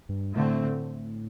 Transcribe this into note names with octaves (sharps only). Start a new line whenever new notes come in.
G2
A2 D3 A3 C4